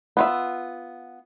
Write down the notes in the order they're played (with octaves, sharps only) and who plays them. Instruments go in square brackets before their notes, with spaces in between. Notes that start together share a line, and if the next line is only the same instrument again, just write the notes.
[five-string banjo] B3 F4 E5